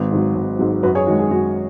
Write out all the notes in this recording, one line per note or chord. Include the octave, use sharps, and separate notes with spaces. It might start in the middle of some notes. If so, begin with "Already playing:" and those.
Already playing: G#1 F#4 B4
G#2 F#3
G#1
G#2 F#3
F#2 F#4 B4
G#4 C#5
D#3 G#3 F#4
G#4
F#2 F#4